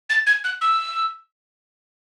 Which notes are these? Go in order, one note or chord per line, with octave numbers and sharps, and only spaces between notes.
A6
G#6
F#6
E6